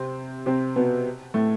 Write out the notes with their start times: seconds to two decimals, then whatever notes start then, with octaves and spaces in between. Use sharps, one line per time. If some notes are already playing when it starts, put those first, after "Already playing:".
Already playing: C3 C4
0.46 C3 C4
0.76 B2 B3
1.34 A2 A3